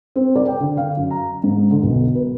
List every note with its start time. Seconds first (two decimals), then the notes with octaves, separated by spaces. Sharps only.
0.16 C4
0.36 D5
0.47 G5
0.60 D3
0.77 F5
0.97 F#2
1.11 A#5
1.44 G#2
1.71 D3
1.83 B1
2.15 B4